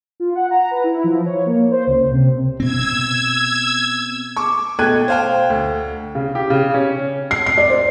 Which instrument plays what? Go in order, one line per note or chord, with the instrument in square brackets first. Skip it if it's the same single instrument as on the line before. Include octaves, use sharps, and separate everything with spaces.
[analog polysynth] F4
F#5
A#5
B4
E4
F3
C#5
A#3
C5
C#2
C3
[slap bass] B2 C4 [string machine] E6 G#6
[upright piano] C#6 D6
B2 A3 G5 F#6 G#6 D#7
C5 F5 G5
D2
[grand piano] C#3
G4
C#3
C#4
[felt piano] C7
C7
D5
C5